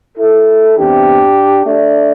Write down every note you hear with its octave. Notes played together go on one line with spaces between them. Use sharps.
E4 A4
E2 C3 E3 D4 G4
A3 D4